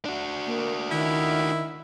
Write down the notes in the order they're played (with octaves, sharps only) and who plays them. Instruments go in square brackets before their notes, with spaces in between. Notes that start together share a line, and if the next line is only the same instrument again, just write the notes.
[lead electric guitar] D4 F#4
[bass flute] A#3
[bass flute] D#3 [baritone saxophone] E4